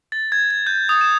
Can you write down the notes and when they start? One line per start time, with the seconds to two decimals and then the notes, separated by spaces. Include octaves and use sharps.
0.12 A6
0.32 G#6
0.50 G#6
0.67 G6
0.89 D#6
1.01 E7